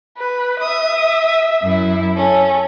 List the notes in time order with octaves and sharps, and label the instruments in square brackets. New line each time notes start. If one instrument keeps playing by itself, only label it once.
[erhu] B4
[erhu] E5 [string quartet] D#6
[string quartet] F#2 E4
[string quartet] C#4 [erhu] A4